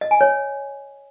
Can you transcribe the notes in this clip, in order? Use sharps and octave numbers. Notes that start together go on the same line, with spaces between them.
D#5
G#5
C#5